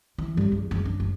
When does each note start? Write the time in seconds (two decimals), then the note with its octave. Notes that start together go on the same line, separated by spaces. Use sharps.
0.18 E3
0.37 G2 F#3
0.52 E2
0.71 F#1
0.85 D4
1.00 F#1